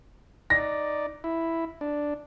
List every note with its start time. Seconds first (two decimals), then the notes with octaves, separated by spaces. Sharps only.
0.50 D#4 D5 A#6
1.24 E4
1.81 D4